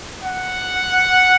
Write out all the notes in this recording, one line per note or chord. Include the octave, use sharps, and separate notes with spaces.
F#5